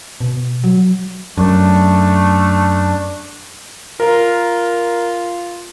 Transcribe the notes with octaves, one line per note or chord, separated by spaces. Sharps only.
B2
F#3
F#2 A3 D4
F4 A#4